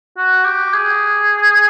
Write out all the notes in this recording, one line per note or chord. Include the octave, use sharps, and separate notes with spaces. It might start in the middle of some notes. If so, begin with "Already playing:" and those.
F#4
G4
G#4